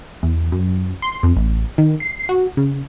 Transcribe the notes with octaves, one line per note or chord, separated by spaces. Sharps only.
E2
F#2
C6
F2
A1
D#3
C7
F#4
C#3